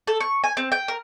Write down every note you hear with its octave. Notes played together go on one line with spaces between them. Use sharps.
A4
C#6
G#5
C4
G5
A#4